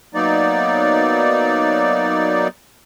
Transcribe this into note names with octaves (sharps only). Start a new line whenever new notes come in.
F#3 A#3 B3 D#4 D5